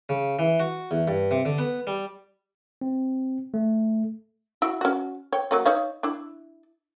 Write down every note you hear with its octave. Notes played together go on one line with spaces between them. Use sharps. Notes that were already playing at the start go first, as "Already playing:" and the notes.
C#3
E3
F#4
E2
G2
C3
D3
B3
G3
C4
A3
E4 F#4
C#4 F#4
C#5 G5
F#3 A#3 C#4
D#4 C#5 F5
D4 E4